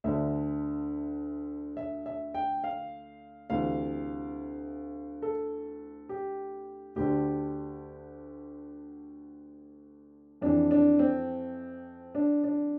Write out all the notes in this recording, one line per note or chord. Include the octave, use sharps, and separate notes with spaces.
D2 D3 E5
E5
E5
G5
F5
D2 C3 E3 F5
A4
G4
D2 D3 G4
F2 E3 D4
D4
C4
D4
D4